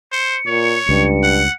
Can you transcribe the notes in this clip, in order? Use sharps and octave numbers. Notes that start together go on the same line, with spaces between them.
C5 C#7
A#2 C#5
C#2 G2
F#5